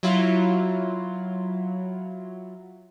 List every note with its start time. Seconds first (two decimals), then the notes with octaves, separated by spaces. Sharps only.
0.03 F#3 E4 F4